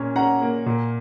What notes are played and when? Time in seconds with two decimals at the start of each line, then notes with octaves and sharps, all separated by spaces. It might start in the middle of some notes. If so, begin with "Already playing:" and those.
Already playing: A#2 A#3 C#4
0.16 C#4 F#5 A#5
0.42 A#3
0.66 A#2